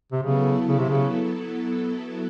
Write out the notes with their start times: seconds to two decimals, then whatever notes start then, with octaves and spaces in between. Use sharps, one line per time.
0.13 C3
0.22 C#3 F#3 B3 E4 A4
0.68 C#3
0.79 C3
0.89 C#3